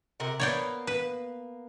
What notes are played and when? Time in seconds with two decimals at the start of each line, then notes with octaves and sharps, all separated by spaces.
0.20 C3 A#4 F#5
0.40 A#3 B3 C#5 D5 G5
0.87 B4